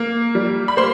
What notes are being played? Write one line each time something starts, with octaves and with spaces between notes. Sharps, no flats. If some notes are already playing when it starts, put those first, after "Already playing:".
Already playing: A#3
G3
B5
A#3 C5 C6